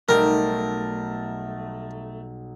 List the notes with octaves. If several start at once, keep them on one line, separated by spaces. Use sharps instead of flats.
B1 G3 A3 G4 A#4